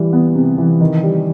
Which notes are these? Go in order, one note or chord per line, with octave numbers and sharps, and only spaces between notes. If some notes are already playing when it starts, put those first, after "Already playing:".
Already playing: E3 G3
B3
C3
E3
D#3
G3